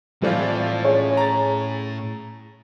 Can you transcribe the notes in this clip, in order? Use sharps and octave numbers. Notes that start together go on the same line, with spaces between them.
A2 E3 F3 G3 C4 F4 D5
C#4 G#4 C#5
A#5 A6